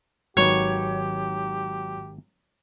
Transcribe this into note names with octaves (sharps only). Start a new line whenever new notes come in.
G#1 D#3 F#3 G4 B4 C#5